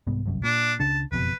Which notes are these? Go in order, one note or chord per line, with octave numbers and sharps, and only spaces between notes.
C2 G#2 B3
G1 C2 F#2
A#2 D4
C#2 C#3 D4 A5
F#1 F2 B2 B4